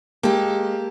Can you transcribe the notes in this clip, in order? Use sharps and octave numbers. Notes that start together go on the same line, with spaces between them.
G#3 A#3 G4 A4